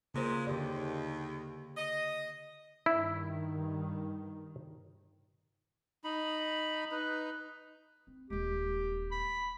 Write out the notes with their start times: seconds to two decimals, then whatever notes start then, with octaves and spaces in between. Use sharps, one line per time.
0.14 F#2 A#2 C#3 G#3 A#3 C5
0.47 D#2 D3 G4 D5
1.77 D#5
2.86 G2 D#3 E4
6.04 D#4 B5
6.91 D#4 B4
8.07 C4
8.30 D#1 G#3 G4
9.11 B5